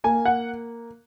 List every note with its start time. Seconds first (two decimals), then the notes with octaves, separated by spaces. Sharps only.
0.04 A#3 G#5
0.25 F#5